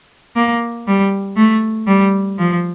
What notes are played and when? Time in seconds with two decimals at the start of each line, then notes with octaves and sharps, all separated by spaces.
0.36 A#3
0.87 G3
1.37 A3
1.87 G3
2.38 F3